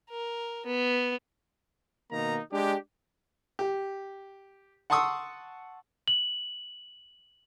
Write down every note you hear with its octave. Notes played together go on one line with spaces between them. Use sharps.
A#4
B3
B2 D#3 A#3 D#4 A#5
G#3 D4 G4
G4
F#5 A5 C6 C#6 D#6 E6
F#7